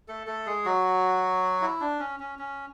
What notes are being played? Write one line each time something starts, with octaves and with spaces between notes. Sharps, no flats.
A3 A4
A3 A4
G#3 G#4
F#3 F#4
E4
D4
C#4
C#4
C#4